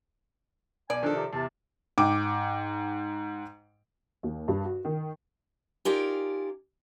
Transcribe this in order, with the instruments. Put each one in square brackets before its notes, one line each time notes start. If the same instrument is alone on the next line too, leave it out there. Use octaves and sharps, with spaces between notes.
[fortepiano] B1 [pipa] D5 [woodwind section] G#5
[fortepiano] D#3 F3 A4 [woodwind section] D4
[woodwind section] C3
[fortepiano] E2 [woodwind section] C3 A5
[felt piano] G#2 G5 D6
[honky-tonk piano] D#2
G2
F#4
D#3
[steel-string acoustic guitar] D#4 F4 G4 A#4 D5 G#5